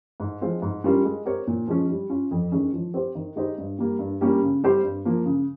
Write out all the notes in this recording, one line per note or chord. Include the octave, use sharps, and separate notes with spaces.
G#2
F3 G#3 C4 F4
G#2
G3 C#4 F4 A#4
G#3
C4 G4 A#4 C#5
A#2
F3 G#3 C#4
G3
C#4 F4
F2
D#3 G#3 C#4
F3
C4 G4 C5
D#3
G#3 D#4 G4 C5
G2
G3 A#3
G2
G3 A#3 C#4 G4
C#3
G3 C4 G4 C5
G2
F3 A#3
C#3